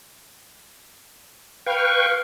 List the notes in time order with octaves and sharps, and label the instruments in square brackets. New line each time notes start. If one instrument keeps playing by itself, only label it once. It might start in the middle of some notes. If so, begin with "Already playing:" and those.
[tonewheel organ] B4 G5 C#6 [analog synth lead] F5